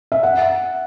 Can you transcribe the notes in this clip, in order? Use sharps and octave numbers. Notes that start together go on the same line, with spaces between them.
E5
F#5